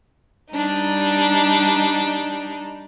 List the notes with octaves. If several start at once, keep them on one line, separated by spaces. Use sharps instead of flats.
G3 D4 D#4